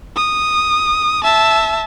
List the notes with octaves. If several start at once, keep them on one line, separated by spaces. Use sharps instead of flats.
D#6
E5 A5